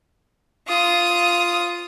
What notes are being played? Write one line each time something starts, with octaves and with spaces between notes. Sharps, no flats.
F4 D#6